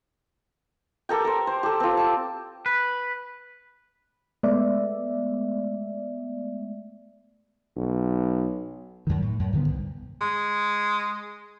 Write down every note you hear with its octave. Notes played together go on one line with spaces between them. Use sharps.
G4 A4 A#4 G5
A#4 C5
C5
G4 A4
C4 F4
A5 D6
B4
G#3 A3 B3 D5 E5
B1
F#2 D#3
A2
F#2
G2 D3 D#3 B3
C2
G#3